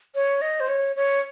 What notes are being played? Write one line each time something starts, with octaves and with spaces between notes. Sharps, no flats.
C#5
D#5
C5
C#5
C#5